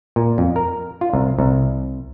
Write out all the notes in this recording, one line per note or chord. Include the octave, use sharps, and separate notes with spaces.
A#2
F2
A#4
F4
C2
C2